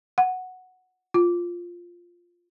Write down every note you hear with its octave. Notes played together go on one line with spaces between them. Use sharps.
F#5
F4